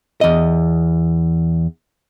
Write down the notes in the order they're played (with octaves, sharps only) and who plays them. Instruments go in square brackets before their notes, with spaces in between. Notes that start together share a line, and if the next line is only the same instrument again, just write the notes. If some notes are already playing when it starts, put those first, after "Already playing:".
[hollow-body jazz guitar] E2 D#5